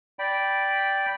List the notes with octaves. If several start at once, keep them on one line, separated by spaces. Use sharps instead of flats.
D5 G5 B5